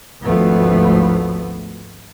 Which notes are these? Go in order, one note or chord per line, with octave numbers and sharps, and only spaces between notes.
G#1 D2 F3 A3 B3